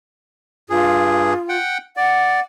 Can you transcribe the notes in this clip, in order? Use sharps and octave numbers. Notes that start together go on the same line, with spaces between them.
G2 F4 G#4
F#5 G5
D5 F#5